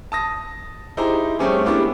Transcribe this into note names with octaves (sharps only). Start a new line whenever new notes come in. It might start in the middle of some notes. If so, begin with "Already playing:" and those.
A5 D#6 A#6
D#4 E4 G4 G#4 C5 A#5
G3 A3 C4 C#4 G4 G#4
G#3 A#3 B3 D4 E4 G4